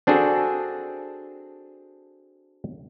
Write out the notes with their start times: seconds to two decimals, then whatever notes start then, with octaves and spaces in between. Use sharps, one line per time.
0.07 C4 D4 F#4 G#4 A4